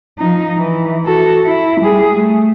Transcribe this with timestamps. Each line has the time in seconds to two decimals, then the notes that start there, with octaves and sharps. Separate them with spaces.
0.19 F3 D#4
0.58 E3
1.05 F#4 A4
1.45 E4
1.81 G3 G#4
2.15 A3